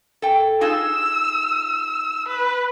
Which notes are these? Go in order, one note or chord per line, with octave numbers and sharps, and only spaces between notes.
A4 G5
D#4 F4 G#4 E6
B4